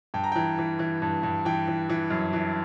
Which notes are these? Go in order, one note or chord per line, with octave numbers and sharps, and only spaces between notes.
G2 G5
A#5
E3 G5
E3
E3
G2
G2
E3 G5
E3
E3
F#2
E3